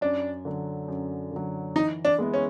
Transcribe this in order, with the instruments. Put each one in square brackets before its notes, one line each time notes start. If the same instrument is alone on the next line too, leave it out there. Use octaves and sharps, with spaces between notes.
[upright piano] F#2 [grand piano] D4
[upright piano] D3 F#3
F#2
D3 F#3
[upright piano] E3 [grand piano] D#4
[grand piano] D4
[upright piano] G#3 B3 E4
[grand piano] C#4